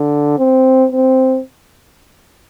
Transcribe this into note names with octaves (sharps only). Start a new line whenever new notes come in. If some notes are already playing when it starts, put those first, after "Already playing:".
Already playing: D3
C4
C4